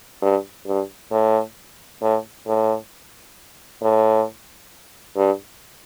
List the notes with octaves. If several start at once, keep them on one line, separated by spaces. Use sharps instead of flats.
G2
G2
A2
A2
A2
A2
G2